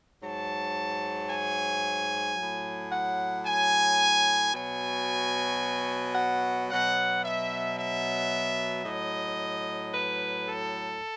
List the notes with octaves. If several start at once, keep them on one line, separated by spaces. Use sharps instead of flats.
G#2 F#3 A5
G#5
A2 F#3
F#5
G#5
B2 F#3 G#5
F#5
B2 F#3 F#5
E5
E5
A2 F#3 D#5
B4
A4